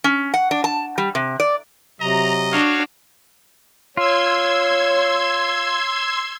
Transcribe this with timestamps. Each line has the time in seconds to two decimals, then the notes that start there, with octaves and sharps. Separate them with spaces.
0.04 C#4
0.34 F#5
0.51 D4
0.64 A5
0.98 G3
1.15 C3
1.40 D5
2.01 C3 F#3 D#5 A#5
2.52 D4 F#4 C#5 F5
3.97 F4 C#5 C6 E6 G#6